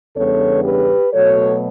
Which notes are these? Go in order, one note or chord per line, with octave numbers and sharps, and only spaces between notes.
E2 C#3 G3 B3 D4 A4 C#5
G4 B4
B2 F#3 A3 A4 C#5